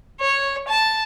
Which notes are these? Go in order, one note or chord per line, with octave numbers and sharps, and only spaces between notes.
C#5
A5